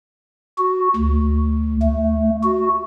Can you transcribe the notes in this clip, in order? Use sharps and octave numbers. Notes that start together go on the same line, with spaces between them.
F#4
D2
A3
F#4